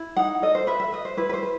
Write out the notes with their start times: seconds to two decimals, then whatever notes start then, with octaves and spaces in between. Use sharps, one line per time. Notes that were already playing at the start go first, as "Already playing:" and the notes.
Already playing: E4
0.16 D#4 F#5
0.42 A4 D#5
0.55 C5
0.67 B4 E5
0.80 E5
0.92 B4 D#5
1.05 C5
1.17 E4 B4
1.29 B4
1.34 C5
1.43 B4